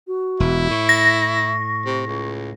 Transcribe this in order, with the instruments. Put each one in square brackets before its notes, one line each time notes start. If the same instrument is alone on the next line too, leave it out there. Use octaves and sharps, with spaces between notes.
[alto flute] F#4
[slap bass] E1 [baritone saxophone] E4
[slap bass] A2 [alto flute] C#6
[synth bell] A#6
[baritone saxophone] C3
C#2